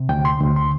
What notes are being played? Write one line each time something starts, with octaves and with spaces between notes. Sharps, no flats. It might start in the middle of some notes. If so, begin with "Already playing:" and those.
Already playing: C3
D2 G5
C6
D2
C6